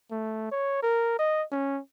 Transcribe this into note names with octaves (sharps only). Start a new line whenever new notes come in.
A3
C#5
A#4
D#5
C#4